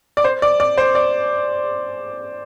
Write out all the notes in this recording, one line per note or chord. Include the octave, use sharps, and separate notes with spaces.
D5
C5
D5
D5
C5
D5